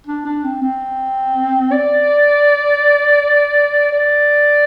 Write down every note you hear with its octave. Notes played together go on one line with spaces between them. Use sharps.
D4
D4
C4
C4
D5
D5